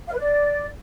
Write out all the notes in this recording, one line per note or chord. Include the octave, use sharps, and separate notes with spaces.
F5
B4
D5